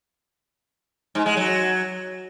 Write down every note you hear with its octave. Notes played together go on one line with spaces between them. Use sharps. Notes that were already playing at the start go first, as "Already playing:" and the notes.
G#2
G#3
F#3